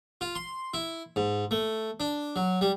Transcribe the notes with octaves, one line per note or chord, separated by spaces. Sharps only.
F4
C6
E4
G#2
A3
D4
F#3
G3